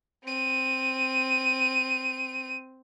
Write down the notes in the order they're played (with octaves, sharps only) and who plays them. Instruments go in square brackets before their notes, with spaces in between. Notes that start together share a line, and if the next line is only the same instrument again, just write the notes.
[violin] C4 D#7